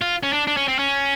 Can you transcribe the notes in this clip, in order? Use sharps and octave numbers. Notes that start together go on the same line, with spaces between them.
F4
C#4
D4
D4
C#4
C4
C#4